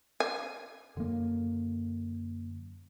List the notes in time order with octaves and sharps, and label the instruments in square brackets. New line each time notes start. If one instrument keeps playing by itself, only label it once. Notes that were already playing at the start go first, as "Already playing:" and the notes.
[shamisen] G#5
[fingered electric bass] F#2 [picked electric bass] D3 A#3